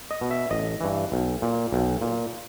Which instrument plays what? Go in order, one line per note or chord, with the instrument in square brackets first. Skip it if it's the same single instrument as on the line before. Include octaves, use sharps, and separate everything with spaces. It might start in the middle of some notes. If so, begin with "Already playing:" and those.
[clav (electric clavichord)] D#5
B2
E5
A1 D#5
G2 E3
B1
A#2
B1
A#2